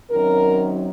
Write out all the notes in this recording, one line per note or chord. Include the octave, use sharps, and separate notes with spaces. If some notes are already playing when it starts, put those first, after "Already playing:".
F#2 D#3 F#3 C4 A#4